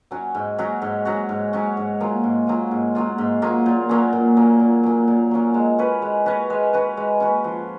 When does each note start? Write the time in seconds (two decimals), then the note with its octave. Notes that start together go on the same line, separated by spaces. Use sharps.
0.11 F#3 C#4 F#4
0.35 G#2
0.58 F#3 C#4 F#4
0.82 G#2
1.05 F#3 C#4 F#4
1.29 G#2
1.53 F#3 C#4 F#4
1.77 G#2
2.00 F#3 A#3 F4
2.24 G#2
2.47 F#3 A#3 F4
2.71 G#2
2.95 F#3 A#3 F4
3.18 G#2
3.42 F#3 A#3 F4
3.66 A#2
3.89 F#3 A#3 C#4
4.13 A#2
4.37 F#3 A#3 C#4
4.60 A#2
4.83 F#3 A#3 C#4
5.08 A#2
5.31 F#3 A#3 C#4
5.54 G#3
5.78 C#4 F#4 B4
6.02 G#3
6.26 C#4 F#4 B4
6.50 G#3
6.73 C#4 F#4 B4
6.97 G#3
7.20 C#4 F#4 B4
7.44 F3